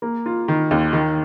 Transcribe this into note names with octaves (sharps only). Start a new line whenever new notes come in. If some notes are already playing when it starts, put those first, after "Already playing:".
A#3
F4
D#3
D#2
D#3